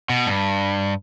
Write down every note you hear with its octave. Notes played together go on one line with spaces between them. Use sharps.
B2
G2